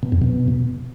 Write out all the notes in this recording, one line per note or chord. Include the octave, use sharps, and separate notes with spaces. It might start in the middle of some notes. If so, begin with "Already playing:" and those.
B2
F2
B2